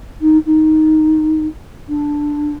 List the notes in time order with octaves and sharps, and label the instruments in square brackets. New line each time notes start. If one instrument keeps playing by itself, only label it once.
[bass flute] D#4
D#4
D4